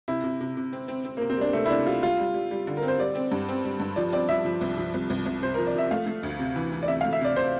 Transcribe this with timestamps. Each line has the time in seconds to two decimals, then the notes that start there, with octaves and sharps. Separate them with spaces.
0.08 C3 E4
0.24 C3
0.41 C3
0.57 C3
0.73 C4
0.88 C4
1.05 C4
1.17 A#3
1.21 C3
1.30 C4
1.37 G3 D4
1.53 C3 A3
1.66 E4
1.70 C3 D4
1.86 G3 F4
2.02 G3 F4
2.19 G3
2.34 G3
2.51 G3
2.67 D3
2.77 A#4
2.83 C4
2.88 C5
2.99 G3 D5
3.15 C4
3.32 G2
3.49 C4
3.64 G3
3.80 G2
3.96 F3 D5
4.12 C4 D5
4.29 F3 E5
4.45 F3
4.61 C2
4.78 F3
4.94 C2
5.10 C2
5.26 C2
5.42 C3 C5
5.54 A#4
5.58 F3
5.67 D5
5.74 F3 E5
5.91 A3 F5
6.06 A3
6.23 D2
6.39 C3
6.56 E3
6.72 E3
6.83 D5
6.88 C3 E5
7.01 F5
7.04 A3
7.13 E5
7.21 C3 D5
7.36 C3 C5